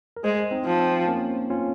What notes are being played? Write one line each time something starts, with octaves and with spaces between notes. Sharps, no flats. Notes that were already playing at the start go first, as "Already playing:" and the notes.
A#4
G#3 G#4 C5
C4 D#4
F3
C4
A#3 C#4
C#4 F4